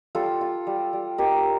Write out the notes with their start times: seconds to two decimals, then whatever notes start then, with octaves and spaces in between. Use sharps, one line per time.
0.15 G3 F4 A4
0.41 F4
0.67 G3
0.93 G3
1.18 D#4 G4 A#4